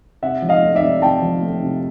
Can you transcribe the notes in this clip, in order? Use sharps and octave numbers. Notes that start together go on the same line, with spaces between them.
C3 E5 F#5
F3
D#5 F5
A3
D5 E5
C3
C3 G5 A5
F3
A3
C3